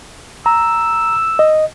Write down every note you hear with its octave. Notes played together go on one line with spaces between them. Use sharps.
A#5 E6
D#5